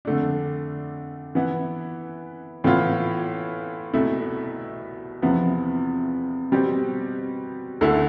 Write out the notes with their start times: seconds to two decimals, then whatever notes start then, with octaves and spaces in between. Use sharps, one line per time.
0.05 F2 D3 A3 D4
1.35 E3 B3 E4
2.64 A2 E3 B3 F4
3.94 C2 B2 A3 E4
5.22 E2 C3 F3 B3 E4
6.52 B2 G3 C4 G4
7.81 D2 D3 A3 E4 A4